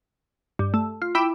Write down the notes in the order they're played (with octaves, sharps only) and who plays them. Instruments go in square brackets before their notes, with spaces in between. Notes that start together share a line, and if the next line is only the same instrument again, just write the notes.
[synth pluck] G2
A3
F4
E4 G5 B5 D6 D7 E7